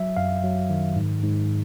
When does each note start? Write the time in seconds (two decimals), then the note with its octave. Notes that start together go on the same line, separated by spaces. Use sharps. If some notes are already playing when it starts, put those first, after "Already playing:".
Already playing: F#3 E5
0.17 F#2 F5
0.44 F#3
0.70 D#3
0.96 G#2
1.23 G#2